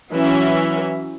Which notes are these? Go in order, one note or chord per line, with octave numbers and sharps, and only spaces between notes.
E3 F#3 C#4 E5